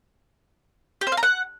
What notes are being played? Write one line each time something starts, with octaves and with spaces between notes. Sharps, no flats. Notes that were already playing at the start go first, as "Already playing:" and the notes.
G4
C5
F5
A#5
F#5